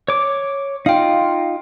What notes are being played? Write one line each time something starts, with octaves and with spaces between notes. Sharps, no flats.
C#5 D6
D#4 F4 F5 G5